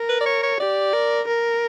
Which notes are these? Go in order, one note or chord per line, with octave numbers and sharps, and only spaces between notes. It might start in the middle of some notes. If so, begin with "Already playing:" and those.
Already playing: A#4
B4
D5
C#5
C#5
G4 D5
A#4
A#4